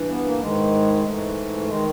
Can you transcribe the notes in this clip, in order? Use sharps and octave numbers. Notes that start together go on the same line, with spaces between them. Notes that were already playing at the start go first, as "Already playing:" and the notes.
Already playing: G2 E3
B3
A#3
G#2 D#3 G#3
G#3
G#2 E3 A3
D#3 G#3